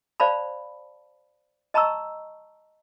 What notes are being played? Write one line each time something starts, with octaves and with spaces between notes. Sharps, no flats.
C5 D5 F5 A5 B5
D#5 A5 A#5 C#6 E6